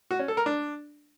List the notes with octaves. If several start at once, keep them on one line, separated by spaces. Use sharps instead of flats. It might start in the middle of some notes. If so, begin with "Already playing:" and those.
F#4
C#4
A4
A#4
D4